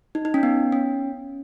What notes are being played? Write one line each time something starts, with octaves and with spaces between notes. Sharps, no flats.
D#4
D#4
C#4
B3
C#4